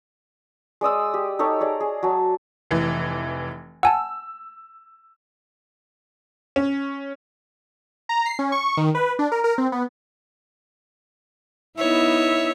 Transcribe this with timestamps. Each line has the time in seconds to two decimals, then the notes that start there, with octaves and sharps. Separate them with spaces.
0.81 G#3 D5 D#6 E6
1.14 G4
1.39 D#4 G4 A4 C#5
1.60 G#4 D5 A#5
1.80 G#4
2.03 F#3 A5
2.71 F1 E3
3.83 F#5 G#5 A5 E6
6.56 C#4
8.09 A#5
8.26 C7
8.39 C#4
8.52 C#6
8.77 D#3
8.95 B4
9.19 D4
9.32 A#4
9.44 A#4
9.58 C4
9.72 B3
11.78 B3 D#4 E4 C#5 E5